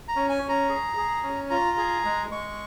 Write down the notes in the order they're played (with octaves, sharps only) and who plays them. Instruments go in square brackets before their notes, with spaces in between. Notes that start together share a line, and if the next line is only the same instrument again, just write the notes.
[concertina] A#5
C#4
G#5
C#4
A#5
G#4
G#4
C#4
F4 A#5
G#4
G#3
G#3 C#6